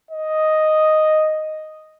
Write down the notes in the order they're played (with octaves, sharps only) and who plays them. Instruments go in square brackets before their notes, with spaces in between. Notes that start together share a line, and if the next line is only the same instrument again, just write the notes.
[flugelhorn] D#5